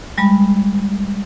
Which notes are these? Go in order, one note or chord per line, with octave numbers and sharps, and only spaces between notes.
G3 G#3 B5